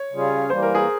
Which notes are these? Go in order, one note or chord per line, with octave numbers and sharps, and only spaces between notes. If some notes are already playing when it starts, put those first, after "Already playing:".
Already playing: C#5
C#3 G3 C#4 F4 G#4
E3 G3 A#3 C5
A#4
G#4